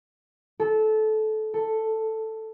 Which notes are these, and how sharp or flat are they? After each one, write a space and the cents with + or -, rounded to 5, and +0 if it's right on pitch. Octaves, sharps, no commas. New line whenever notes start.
A4 -20
A4 +5